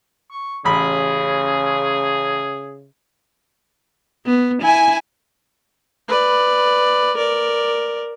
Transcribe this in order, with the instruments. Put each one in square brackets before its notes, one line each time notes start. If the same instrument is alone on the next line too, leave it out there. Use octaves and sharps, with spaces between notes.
[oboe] C#6
[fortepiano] A1 B5 [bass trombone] C#3 [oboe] G#4
[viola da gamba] B3
[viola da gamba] E4 [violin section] G#5
[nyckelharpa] B4 D5
A#4 D5